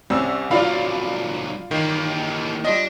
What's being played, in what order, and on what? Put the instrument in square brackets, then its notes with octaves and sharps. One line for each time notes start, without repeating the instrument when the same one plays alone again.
[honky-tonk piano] C2 C#4 E6 [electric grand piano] C4
[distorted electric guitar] C2 F#3 [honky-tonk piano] F4 D5 F5 [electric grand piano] B5 F6
[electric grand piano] D#3 [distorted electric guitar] E3 A#3
[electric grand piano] G3 F4 D#5 [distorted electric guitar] D4